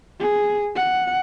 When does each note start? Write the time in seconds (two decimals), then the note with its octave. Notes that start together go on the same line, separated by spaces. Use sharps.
0.20 G#4
0.76 F#5